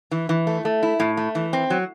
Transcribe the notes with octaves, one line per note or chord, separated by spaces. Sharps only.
E3
E3
A3
A3
E4
A2
A3
E3
C4
F#3